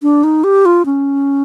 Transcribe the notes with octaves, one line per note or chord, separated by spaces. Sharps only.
D4
D#4
G4
F4
C#4